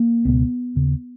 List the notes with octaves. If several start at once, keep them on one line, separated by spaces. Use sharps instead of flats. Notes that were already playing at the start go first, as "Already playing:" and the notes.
Already playing: A#3
C#2 B2 B3
D#2 C#3